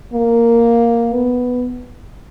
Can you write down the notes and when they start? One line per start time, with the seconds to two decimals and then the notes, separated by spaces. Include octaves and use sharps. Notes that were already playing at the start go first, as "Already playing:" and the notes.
0.14 A#3
1.13 B3